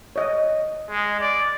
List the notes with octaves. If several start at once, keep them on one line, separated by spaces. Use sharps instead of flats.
C#5 D#5
G#3
D5